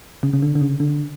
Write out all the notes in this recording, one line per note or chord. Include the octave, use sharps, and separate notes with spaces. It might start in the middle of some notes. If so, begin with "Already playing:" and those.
C#3
C#3
D3
D3
C#3
D3